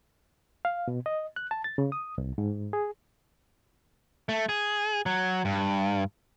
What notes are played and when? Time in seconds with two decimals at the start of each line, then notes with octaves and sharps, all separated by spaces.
0.65 F5
0.88 B2
1.06 D#5
1.36 F#6
1.51 A5
1.64 A6
1.78 C#3
1.92 D#6
2.18 C2
2.38 G#2
2.73 G#4
4.29 A3
4.49 G#4
5.06 F#3
5.45 G2